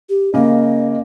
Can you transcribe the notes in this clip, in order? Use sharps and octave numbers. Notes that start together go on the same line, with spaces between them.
G4
C#3 A#3 D#5